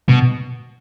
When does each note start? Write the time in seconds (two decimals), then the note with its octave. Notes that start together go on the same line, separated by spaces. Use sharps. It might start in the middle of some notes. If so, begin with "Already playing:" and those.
0.09 B2